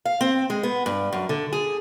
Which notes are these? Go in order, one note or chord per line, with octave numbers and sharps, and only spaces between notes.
F5
C4
G#3
B3
G2
F#2
D3
G#4